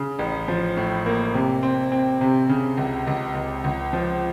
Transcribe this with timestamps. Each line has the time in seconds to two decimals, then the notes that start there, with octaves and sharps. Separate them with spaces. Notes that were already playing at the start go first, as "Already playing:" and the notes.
Already playing: C#3
0.19 A1
0.48 F3
0.77 A2
1.06 A#3
1.34 C3
1.63 C4
1.92 C4
2.21 C3
2.49 C#3
2.77 C#2
3.07 C#2
3.35 C#2
3.64 C#2
3.93 F3